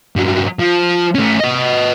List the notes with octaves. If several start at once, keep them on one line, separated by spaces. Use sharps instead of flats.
G2 F#3
F3
A3 C#4
B4 D#5